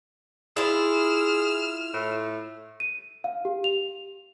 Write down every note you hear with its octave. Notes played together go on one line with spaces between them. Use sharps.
E4 F4 G#4 F6 E7
A2
D#7
F5
G4
F7